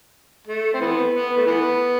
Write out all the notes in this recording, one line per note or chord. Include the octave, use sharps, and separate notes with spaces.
A3
C4
E3 B3
B3
A3
E3 B3